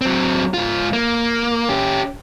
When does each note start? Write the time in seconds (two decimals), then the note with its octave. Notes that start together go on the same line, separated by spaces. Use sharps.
0.01 F#3 C4
0.54 G#2 F4
0.93 A#3
1.69 C#4 G4